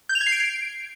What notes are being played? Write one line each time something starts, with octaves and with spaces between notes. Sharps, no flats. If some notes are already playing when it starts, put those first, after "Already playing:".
G6
F7
G#6
C7
D7